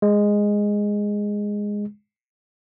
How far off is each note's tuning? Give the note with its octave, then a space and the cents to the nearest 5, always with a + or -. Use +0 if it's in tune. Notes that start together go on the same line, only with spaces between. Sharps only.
G#3 -10